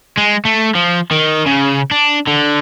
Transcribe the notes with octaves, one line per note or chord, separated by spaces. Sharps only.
G#3
A3
F3
D#3
C#3
D4
D3